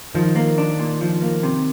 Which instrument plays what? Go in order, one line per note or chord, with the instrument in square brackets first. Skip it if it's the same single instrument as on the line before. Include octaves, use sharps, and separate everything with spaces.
[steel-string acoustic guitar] D#3 [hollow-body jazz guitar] F3
[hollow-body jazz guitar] A#3
D4
A#2
F3
A#3
C3